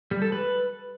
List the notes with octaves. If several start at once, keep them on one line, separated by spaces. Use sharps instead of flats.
G3
A4
B4